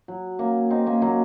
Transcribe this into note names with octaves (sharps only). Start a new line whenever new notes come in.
F#3
A#3 C#4
C4 D#4
A#3 C#4
F#3 A#3